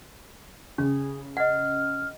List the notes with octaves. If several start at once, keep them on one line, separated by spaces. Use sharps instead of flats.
C#3 C#4 G#4
D#5 F#5 F6